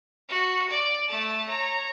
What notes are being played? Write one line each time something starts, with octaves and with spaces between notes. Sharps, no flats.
F#4
D5
A3 A5
C#5 A#5